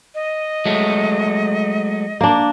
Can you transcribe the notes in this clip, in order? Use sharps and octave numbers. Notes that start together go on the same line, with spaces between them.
D#5
F#3 G#3 A3
A#3 D4